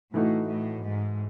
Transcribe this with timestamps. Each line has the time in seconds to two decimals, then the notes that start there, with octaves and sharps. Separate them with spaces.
0.14 A2 E3 A3 D#4 F#4
0.49 A2
0.85 G#2